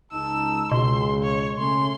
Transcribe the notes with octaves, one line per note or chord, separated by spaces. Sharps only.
C#2 D#4 A5 E6
C#2 B2 C6
C#5
C#3 A3 C#4 C6